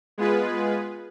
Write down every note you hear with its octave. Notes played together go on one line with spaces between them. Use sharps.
G#3 B3 F4 G#4 B4